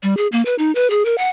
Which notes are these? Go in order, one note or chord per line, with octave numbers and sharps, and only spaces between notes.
G3
G#4
A#3
B4
D#4
B4
G#4
A#4
F#5